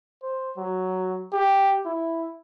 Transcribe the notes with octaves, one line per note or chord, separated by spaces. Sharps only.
C5
F#3
G4
E4